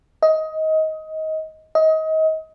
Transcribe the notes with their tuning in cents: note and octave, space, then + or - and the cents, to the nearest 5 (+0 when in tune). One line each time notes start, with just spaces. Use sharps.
D#5 +20
D#5 +30